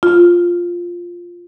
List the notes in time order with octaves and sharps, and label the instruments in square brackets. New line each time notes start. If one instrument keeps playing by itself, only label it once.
[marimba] F4